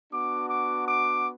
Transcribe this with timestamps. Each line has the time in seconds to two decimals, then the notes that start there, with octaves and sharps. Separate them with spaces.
0.12 B3 D4 F#4 D6
0.50 D6
0.88 D6